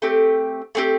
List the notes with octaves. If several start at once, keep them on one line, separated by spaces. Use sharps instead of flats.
A3 C4 G4
A3 C4 G4